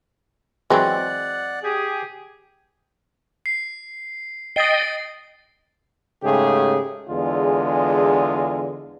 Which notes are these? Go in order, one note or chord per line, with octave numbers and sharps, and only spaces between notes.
E3 F#3 G#3 C4 D5 F#5
G4 G#4
C7
D#5 G5 D#6 A6 C7
G#2 C#3 A3 G4 G#4
E2 D3 G#3 F4 G#4